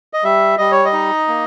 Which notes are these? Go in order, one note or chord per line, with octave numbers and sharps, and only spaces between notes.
D#5
G3 E5
G3 D#5
C#5
D#5
D#4
A#3